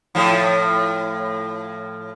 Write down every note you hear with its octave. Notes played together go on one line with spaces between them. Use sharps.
A2 F3